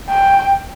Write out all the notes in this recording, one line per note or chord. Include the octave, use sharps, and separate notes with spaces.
G5